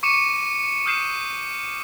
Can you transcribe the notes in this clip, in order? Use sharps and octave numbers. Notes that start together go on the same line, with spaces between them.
C#6 D6 C#7 D#7 E7
D#6 F6 G6 C7 E7